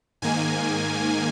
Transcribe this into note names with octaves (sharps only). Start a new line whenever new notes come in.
G#2 D#3 A#3 G#5